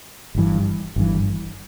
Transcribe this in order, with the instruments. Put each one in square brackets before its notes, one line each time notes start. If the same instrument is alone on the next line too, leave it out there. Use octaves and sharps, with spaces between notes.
[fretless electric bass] G1 G2 E3
G1 G2 E3